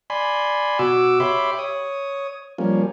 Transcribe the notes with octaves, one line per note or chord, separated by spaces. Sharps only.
D5 G#5 B5 C6
B2 F#4 D6 E6
G4 C#5 E5 B5 C6 D6
C#5 D#6
F3 G3 A#3 C#4